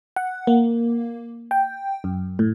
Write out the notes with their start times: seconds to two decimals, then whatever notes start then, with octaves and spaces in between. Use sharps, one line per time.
0.16 F#5
0.47 A#3
1.51 G5
2.04 F#2
2.39 A2